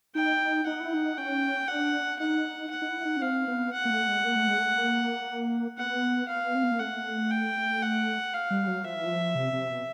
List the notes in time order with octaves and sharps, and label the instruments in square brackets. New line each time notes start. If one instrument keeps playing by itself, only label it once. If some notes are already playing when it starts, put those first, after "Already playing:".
[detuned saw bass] D#4 [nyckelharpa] G5
[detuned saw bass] D#4 [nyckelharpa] F#5
[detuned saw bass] E4
D#4
[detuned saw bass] C#4 [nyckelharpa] G5
[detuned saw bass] D4 [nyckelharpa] F#5
[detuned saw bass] D#4 [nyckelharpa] F#5
[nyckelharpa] F#5
[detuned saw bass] D#4
E4
D#4
C#4
[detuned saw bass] C4 [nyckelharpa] F5
[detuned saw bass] B3
[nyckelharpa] F#5
[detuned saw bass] A#3
A3
G#3
A#3
A3
G#3
A3
A#3
[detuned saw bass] B3 [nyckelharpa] F#5
[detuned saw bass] B3 [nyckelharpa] F5
[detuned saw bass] C4
B3
A#3
[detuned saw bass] A3 [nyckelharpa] F#5
[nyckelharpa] G5
F#5
F5
[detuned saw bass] G3
F#3
[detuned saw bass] F3 [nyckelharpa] E5
[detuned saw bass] E3
F3
C3
C3
B2